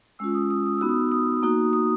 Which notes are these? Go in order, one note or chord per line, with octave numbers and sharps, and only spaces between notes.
G#3 C#4 F4 E6
D#6
D#6
D#6
B3 D#4 F#4 E6
D#6
D#6
A#3 D#4 F#4 D#6
D#6